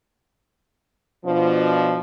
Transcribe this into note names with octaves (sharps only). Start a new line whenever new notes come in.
B2 F3 D4